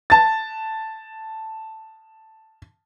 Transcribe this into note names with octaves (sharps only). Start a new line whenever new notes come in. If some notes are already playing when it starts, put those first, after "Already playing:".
A5 A6